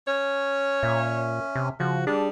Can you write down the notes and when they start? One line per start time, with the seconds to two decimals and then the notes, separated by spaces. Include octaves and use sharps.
0.07 C#4 C#5
0.83 A#2 E5
1.56 C3
1.80 C#3 F3 F#4
2.07 G3 D4 G#4 A5